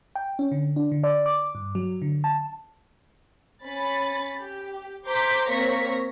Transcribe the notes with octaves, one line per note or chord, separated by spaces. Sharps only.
G5
C#4
D3
D4
D3
D5
D6
G2
F#3
D3
A5
C#4 B5 A6
G4
C5 A#5 C6 D6 G6 B6
A#3 C4 C#5 C#6 A#6 B6